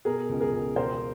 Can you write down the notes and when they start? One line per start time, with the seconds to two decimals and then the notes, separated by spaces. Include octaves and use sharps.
0.05 B2 G#4 A#4
0.29 C#2
0.40 G#4 A#4
0.53 C#2
0.76 E1 A#4 C5